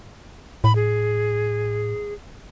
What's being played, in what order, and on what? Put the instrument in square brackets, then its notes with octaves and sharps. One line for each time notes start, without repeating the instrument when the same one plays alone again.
[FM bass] A2 [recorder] B5
[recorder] G#4